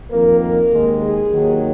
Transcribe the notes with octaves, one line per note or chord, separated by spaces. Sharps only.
F2 D#3 A#3 A#4
A#4
D#2 D#3 G#3
G#4
D#2 D#3 F#3